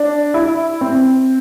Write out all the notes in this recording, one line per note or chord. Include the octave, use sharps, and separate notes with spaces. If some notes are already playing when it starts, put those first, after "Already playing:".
Already playing: D4
E4
C4